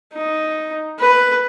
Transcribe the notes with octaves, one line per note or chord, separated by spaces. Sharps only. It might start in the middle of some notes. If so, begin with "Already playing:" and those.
D#4
B4